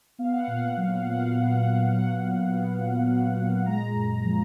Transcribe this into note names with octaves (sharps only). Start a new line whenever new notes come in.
B3 F5
F#5
A#2 F5
F#5
F5
F#3 F#5
F5
A#2 F#5
F5
B3 F#5
F5
F#5
A#2
F5
F#3 F#5
A#2
B3
A#2
F#3
A#2
G#3 A#5
F#2
F3